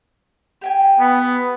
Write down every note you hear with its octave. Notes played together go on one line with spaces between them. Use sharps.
G4 G5 G#5
B3